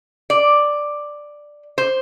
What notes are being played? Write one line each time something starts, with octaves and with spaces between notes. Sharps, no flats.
D5
C5